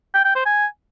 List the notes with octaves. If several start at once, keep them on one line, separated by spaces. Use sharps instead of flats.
G5
G5
C5
G#5